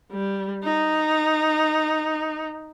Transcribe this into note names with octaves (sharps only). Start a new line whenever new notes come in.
G3
D#4